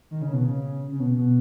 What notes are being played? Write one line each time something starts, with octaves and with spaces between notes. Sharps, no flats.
D#3
C#3
B2
C#3
C#3
B2
B2